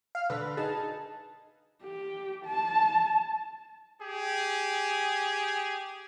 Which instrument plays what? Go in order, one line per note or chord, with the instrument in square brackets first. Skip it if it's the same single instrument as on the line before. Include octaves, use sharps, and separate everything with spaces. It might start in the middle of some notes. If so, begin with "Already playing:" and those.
[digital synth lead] F5
[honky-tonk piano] D3 [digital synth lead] B4
[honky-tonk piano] D#4 G#4 [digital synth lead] A5
[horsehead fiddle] G4
A5
[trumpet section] G4 G#4